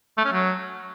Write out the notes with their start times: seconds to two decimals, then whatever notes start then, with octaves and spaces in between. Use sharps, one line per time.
0.18 A3
0.25 C#4
0.32 F#3